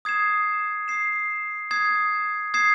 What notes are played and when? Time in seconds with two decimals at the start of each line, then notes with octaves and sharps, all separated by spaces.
0.05 D#6 G#6 C7 E7
0.88 D#6 G#6 C7 E7
1.71 D#6 G#6 C7 E7
2.54 D#6 G#6 C7 E7